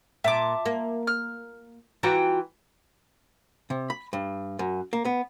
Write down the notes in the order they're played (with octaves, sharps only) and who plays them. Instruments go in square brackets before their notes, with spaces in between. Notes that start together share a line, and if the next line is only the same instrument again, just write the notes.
[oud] A#2 [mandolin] E5 A5 D6
[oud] A#3
[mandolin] F6
[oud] E3 F4 F#4 [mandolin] G5 A#5
[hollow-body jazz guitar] C3
B5
G2
F#2
A#3
B3